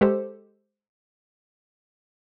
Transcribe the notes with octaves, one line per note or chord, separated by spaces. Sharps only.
G#3 G4 A4 C5